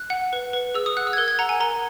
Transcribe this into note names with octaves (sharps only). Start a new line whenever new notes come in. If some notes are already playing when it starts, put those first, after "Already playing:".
Already playing: F#6
F#5
B4
B4
G#4 E6
D#6
F#5 F#6
E6
G#6
A#4 F#6
G#6
F#5 A#5
G#5
A#4 A#5